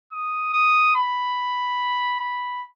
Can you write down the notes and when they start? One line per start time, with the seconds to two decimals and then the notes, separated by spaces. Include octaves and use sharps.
0.12 D#6
0.53 D#6
0.95 B5
2.20 B5